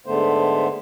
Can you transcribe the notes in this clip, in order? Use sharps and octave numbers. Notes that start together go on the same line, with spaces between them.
G#2 D3 A3 B3 C5